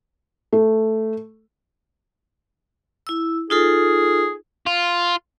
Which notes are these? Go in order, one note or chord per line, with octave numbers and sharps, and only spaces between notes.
A3
E4 E6
D#4 F4 G#4 A4
F4